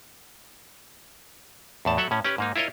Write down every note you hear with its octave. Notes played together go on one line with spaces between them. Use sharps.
E2 A2 A5
F#3 A4 E5 F#5
A2 C#4
C#4 G4 B4
G#2 A#3 D#4
E4 F4 A#4 C#5 D#5